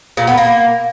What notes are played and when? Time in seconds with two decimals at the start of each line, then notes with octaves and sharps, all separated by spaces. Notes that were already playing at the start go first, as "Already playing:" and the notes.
0.17 A#2
0.27 B3
0.38 A#3